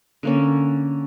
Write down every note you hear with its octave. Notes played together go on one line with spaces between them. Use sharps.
D3 A#3 C#4